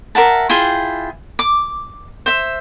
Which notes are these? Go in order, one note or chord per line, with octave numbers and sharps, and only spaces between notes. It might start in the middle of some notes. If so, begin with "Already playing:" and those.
A#4 E5 F#5 A5
E4 F4 G#4 G5
D6
C5 E5